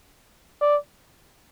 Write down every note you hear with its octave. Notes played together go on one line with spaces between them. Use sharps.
D5